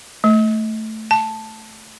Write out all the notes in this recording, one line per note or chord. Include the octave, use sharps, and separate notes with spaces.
A3
A5